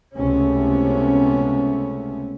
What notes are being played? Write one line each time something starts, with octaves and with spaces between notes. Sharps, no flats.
C#2 C3 A3 B3 C#4